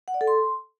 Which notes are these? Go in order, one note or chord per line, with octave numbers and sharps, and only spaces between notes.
F#5
D5
A4
C6